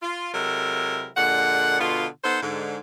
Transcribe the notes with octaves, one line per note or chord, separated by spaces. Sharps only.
F4
C3 F#3 G#3 E4 A4 A#4
A#2 D3 G#3 F#5
B2 D3 G#3 B3 F4
B3 D#4 A4 C5
G#2 D3